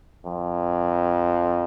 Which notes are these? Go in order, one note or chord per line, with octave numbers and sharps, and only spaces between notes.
F2